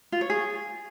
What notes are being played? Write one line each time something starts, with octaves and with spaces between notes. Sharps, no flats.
F4
C#5
G#4